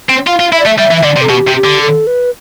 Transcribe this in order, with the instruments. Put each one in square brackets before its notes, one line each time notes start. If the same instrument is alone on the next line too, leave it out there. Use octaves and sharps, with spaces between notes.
[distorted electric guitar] C4
[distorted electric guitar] F4 [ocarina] F5
[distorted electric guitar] F4
[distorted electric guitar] E4 [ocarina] E5
[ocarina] D5
[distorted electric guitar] A3 [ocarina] E5
[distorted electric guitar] G3 [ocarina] E5
[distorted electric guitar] E3
[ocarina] E5
[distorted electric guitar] D3 [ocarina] D5
[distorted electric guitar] C3
[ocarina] A4
[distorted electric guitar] B2 [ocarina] G4
[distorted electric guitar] C3
[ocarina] G4
[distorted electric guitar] D3
[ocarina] A4
B4